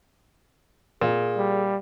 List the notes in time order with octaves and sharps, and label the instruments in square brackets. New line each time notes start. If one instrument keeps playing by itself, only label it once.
[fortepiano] A#2 [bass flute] G#4
[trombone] G3